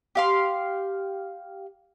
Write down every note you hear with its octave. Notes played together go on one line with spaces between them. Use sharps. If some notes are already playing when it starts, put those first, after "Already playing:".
G4 F5 C6